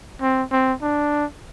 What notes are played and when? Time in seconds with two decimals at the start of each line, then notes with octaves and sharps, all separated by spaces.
0.21 C4
0.52 C4
0.82 D4